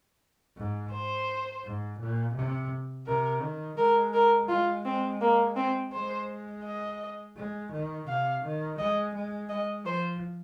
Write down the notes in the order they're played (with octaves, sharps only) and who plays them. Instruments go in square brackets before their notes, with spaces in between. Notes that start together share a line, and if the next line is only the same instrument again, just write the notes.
[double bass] G#2
[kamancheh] C5
[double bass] G#2
A#2
C3
[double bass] C3 [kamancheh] A#4
[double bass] D#3
[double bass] G#3 [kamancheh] A#4
[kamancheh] A#4
[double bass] G#3 [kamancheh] F4
[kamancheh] C4
A#3
C4
[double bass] G#3 [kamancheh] C5
[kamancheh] D#5
[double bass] G#3
D#3
[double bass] C3 [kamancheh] F5
[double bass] D#3
[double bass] G#3 [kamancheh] D#5
[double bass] G#3
[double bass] G#3 [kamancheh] D#5
[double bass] F3 [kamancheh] C5